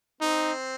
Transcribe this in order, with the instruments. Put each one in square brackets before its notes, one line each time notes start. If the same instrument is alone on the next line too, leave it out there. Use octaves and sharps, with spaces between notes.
[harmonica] C4 [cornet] D#4